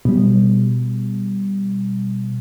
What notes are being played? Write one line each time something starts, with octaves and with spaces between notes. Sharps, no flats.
B2 G3